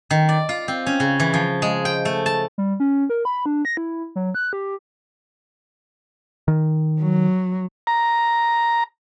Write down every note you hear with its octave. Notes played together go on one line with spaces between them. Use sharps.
D#3
D5
F4
C4
C#4
C#3
E3
F3
G#3
G5
A3
A5
G3
C#4
A#4
B5
D4
A#6
E4
F#3
F#6
G4
D#3
F#3
A#5